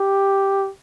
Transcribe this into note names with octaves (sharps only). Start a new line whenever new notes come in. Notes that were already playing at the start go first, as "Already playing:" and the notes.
Already playing: G4